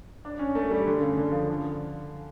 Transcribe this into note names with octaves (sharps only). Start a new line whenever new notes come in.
D4
C#4
A3
G3
D3
C#3
D3
F3
D3